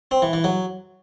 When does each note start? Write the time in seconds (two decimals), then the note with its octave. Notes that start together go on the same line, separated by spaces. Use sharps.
0.11 C4
0.22 E3
0.33 E3
0.44 F#3